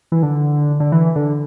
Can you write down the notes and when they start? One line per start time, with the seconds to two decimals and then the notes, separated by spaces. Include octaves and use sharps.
0.12 E3
0.23 D3
0.80 D3
0.92 E3
1.16 D3